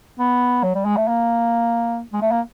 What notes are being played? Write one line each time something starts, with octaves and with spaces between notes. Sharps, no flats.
B3
F#3
G3
G#3
A3
A#3
G#3
A3
A#3